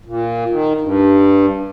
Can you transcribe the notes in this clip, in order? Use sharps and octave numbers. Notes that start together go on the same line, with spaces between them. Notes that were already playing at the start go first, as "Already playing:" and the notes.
A#2
D#3
G2